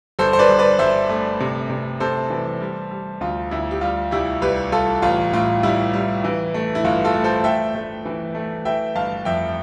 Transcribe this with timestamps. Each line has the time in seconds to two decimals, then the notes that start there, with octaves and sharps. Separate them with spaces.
0.19 G1 A4 C5
0.33 C5
0.39 B4 D5
0.49 G1
0.59 B4 D5
0.79 G1 C5 E5
1.09 A3
1.40 C3
1.70 C3
2.00 C3 A4 C5
2.30 E3
2.61 G3
2.91 G3
3.21 D2 F4
3.51 D2 E4
3.71 G4
3.81 G3 F4
4.11 C2 E4 G4
4.42 C2 G4 B4
4.72 C2 F4 A4
5.02 A1 F4
5.33 A2 F4
5.63 G3 E4
5.93 G3
6.24 E3
6.54 A3
6.75 E4
6.84 G1 F4
7.04 F4 A4
7.14 A3
7.24 A4 C5
7.44 A3 E5 G5
7.75 A3
8.05 E3
8.35 A3
8.65 E3 E5 G5
8.96 G1 F5 A5
9.25 F2 E5 G5